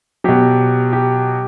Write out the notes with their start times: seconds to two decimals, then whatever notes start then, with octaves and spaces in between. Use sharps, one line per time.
0.24 B2 F#3 G4
0.93 G4